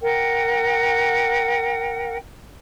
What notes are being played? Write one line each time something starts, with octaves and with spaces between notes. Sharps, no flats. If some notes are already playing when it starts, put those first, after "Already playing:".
A#4 F#5 G5